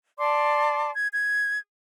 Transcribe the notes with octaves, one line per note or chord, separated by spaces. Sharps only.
D5 A5 C6 D6
G#6
G#6